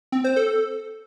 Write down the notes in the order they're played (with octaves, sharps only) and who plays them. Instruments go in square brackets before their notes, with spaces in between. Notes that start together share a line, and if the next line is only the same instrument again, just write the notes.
[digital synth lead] C4
C5
A4